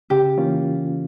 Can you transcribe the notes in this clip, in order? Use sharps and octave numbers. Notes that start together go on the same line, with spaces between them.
C#3 G4
E3 A#3 C#4 F4